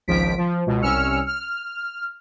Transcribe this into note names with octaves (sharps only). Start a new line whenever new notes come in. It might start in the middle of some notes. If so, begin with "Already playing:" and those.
G#1 C#2 F3 B6 D7
F3
C#2 B2
C2 C#4 E6 F6 C#7
F6